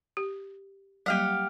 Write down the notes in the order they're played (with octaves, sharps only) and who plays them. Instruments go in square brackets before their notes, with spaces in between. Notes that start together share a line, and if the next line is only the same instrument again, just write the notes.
[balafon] G4
[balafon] F#3 G3 A#3 [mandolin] G4 F5 F#5